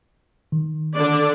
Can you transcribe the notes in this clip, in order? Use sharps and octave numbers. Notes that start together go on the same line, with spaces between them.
D#3
D3 D4 D5